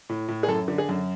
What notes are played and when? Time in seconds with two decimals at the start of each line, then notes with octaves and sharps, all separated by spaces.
0.09 A2
0.28 A2
0.43 G#4
0.48 F#2 A4
0.68 D3
0.78 G#4
0.89 F#2